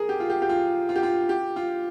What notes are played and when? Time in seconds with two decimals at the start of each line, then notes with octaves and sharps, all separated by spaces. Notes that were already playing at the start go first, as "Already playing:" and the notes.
Already playing: G#4 A#4
0.09 G4
0.20 F4
0.30 G4
0.42 G4
0.49 F4
0.89 F4
0.96 G4
1.03 F4
1.29 G4
1.56 F4